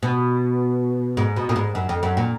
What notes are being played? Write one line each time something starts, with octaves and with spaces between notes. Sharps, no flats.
B2
G#2
B2
A#2
G#2
F#2
F2
F#2
A#2